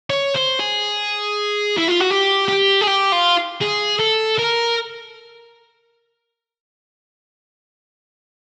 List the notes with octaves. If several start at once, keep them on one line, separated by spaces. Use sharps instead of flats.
C#5
C5
G#4
E4
F4
F#4
G4
G4
G#4
G4
F4
G#4
A4
A#4